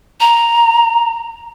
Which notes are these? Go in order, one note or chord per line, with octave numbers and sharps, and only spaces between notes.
A#5